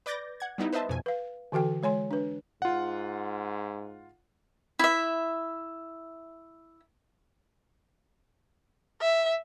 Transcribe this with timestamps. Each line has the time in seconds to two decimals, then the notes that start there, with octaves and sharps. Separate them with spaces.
0.06 B4 D5 D6 G6 A6 A#6
0.40 F#5 G#6
0.58 G3 B3 D#4 E4
0.73 B4 C5 D#5 E5 A5
0.89 F2 B2 G#5
1.06 B4 F5
1.52 D3 E3 F#4 A4 G5
1.83 G#3 C#5 G#5 C6
2.11 D4 B4
2.62 G#2 F4 F#5
4.79 E4 E5
9.01 E5